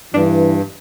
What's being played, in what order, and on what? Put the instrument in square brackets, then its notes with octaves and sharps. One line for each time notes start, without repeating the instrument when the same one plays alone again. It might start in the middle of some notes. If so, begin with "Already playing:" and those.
[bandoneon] G2 [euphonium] E3 [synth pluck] D4